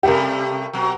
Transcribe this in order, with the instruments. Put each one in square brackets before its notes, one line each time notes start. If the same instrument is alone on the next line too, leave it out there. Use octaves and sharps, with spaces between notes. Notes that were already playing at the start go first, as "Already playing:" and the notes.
[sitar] C3 G3 A3 [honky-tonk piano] G4 A#4
[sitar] B2 F#3